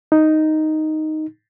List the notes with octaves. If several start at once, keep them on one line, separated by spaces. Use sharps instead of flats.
D#4